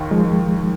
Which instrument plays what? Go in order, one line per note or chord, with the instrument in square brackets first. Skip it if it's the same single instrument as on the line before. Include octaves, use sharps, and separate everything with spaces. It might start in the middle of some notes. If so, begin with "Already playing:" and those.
Already playing: [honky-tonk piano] D#2 D#3
[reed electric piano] F3 G#3